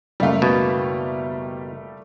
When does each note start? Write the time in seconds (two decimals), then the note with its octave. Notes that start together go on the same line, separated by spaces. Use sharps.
0.20 F#1 G3 A3 F5
0.42 B2